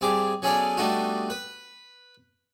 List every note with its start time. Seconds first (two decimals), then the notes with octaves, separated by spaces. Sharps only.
0.01 G2 C4 G#4 D6
0.42 F#3 B3 C#4 G#4 A4 D5
0.77 G3 A3 B3 D4 D#4 F#4
1.30 B4